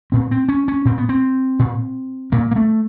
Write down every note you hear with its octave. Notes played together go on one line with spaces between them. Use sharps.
A#2 C4
C4
C#4
C#4
A#2 C4
B3
C4
A#2
A#2 A#3
A#3
A3